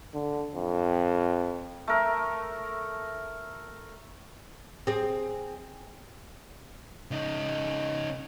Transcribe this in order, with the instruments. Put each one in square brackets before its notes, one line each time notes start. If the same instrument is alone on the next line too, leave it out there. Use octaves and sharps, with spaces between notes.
[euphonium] D3
F2
[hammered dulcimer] A3 A#4
[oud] C4 G#4
[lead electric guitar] C#3 D#4